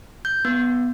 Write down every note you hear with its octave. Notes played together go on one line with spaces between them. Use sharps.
G6
B3